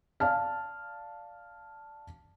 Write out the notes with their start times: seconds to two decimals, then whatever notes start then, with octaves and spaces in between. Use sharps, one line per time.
0.20 D5 F5 A5 F6